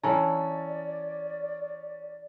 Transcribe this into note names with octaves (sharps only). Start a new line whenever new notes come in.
E3 C#4 A4 D5 A#5